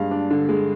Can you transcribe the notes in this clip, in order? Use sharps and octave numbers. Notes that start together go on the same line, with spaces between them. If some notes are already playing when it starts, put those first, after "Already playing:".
Already playing: G2 G#3 F5
D4
D3
G#3